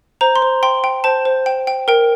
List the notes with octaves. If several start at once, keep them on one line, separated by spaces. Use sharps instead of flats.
C5 A#5
C6
C5
G5 C6
G5
C5 A5
C5
G5
G5
A#4 G5